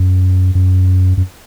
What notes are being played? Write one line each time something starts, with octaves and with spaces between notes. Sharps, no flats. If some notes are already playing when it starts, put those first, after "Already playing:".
Already playing: F#2
F#2
F#2